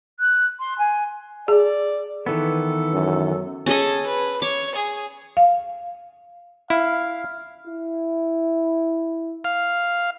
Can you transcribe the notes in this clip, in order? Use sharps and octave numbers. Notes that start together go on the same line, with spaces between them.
F#6
C6
G#5
G#4 D5
D#3 E3 B3 A4
F#2
C#4 G#4 A4 D#5
B4
C#5 D6
G#4
F5
E4 F5
E4
F5